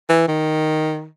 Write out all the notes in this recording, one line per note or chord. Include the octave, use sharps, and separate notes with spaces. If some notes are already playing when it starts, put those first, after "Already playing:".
E3
D#3